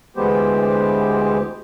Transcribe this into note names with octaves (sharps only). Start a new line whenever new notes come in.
D2 E3 G#3 B3 G4 C5